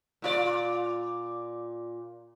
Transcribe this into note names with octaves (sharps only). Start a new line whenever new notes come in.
A#2 F4 D5